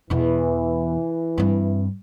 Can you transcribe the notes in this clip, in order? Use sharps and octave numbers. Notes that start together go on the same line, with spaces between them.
E2 B2 E3
G2 C4